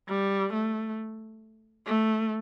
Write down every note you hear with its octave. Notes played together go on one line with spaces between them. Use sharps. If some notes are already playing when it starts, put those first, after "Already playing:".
G3
A3
A3